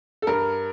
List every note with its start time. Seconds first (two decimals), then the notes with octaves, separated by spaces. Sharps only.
0.22 A4
0.27 G2 A#4